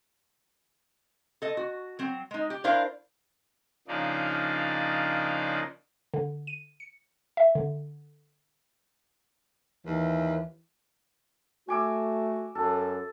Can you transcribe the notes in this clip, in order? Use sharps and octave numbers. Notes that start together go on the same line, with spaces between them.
A4 D#5
F#4
F#3 C4
G#3 D#4
G4
D4 E4 A#4 C5 D5 F5
C#3 F3 A#3 D4 D#4 D5
D3
D#7
C#7
E5
D3
D#2 E3
A3 F#4 G#5 D6 E6
F#2 A4